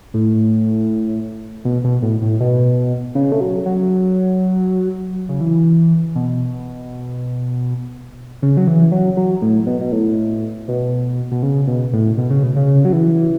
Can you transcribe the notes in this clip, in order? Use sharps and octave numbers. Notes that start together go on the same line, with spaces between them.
A2
B2
B2
A2
A2
B2
C#3
A3
F#3
F#3
C#3
E3
B2
C#3
F#3
E3
F#3
F#3
A2
B2
B2
A2
B2
B2
C#3
B2
A2
B2
C#3
B2
C#3
F#3
E3